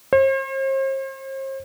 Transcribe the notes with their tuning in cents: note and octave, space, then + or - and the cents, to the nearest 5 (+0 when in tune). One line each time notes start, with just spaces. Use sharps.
C5 +40